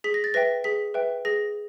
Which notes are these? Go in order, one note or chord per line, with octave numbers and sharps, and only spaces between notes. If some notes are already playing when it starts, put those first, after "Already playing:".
G#4 B6
A#6
A6
B4 E5 G5 A#6
G#4 B6
B4 E5 G5
G#4 A#6